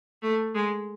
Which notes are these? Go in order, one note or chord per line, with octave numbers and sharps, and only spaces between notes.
A3
G#3